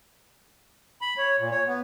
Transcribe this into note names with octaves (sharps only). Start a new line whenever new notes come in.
B5
C#5
A#2
C#5
B3